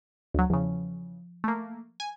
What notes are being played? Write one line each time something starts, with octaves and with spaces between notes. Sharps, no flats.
D2 F#3
E2 C#3 F3
A3 A#3
G#5